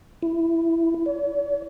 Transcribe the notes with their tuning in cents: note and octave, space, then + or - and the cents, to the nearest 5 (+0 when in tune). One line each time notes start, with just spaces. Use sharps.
E4 +10
C#5 +45